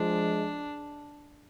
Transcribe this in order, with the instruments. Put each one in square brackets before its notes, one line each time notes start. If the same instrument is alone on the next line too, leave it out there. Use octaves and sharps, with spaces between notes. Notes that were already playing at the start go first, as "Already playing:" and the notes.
Already playing: [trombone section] F3 G#3 [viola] D4